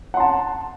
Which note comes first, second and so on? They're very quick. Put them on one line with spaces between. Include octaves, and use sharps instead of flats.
F#5 C6 A5